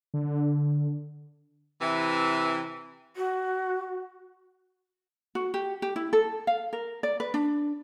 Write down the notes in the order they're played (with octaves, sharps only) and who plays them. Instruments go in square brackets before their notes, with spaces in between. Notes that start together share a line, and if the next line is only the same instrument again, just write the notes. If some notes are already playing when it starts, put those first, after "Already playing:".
[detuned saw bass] D3
[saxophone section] C3 E3
[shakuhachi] F#4
[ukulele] F#4
G4
G4
E4
A4
F5
A#4
D5
B4
D4